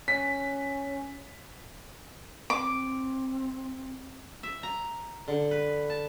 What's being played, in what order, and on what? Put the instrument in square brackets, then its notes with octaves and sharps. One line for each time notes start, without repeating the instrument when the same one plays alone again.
[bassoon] C#4 [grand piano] B6
[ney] C4 [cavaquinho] D6
[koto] E5
A#5
D3
B4
A5